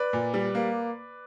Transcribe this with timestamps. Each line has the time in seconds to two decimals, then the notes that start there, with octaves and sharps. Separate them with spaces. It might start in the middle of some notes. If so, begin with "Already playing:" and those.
Already playing: B4 D5
0.13 A#2
0.34 G3
0.55 A#3